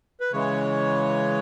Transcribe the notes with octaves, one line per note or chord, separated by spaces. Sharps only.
B4
C#3 E3 G#3 C#5